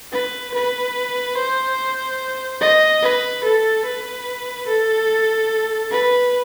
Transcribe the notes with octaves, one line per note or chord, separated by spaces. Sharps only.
B4
B4
C5
D#5
B4
A4
B4
A4
B4